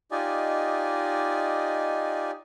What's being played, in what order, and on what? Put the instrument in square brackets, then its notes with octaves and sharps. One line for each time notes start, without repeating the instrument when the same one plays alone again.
[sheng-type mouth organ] D#4 F4 G4 D5 D#5 G#5